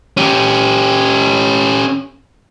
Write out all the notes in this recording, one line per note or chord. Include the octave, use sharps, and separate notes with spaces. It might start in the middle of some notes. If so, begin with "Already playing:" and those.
C#4 G4